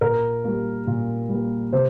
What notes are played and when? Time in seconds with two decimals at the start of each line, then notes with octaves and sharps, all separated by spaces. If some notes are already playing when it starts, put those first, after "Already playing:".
0.01 A#2 A#4
0.44 G3 A#3
0.87 A#2
1.29 G3
1.34 A#3
1.73 C3 C5